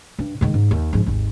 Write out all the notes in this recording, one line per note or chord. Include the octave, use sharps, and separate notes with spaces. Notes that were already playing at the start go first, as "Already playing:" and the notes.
G2
G#2 D#3
G#2
D#2
G#2 F3
G#1 D#2